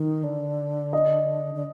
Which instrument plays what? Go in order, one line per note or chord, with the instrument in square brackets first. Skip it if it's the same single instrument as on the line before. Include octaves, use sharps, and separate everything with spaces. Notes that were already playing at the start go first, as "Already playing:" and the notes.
Already playing: [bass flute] D#3
D3
[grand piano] D#5
[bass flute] D3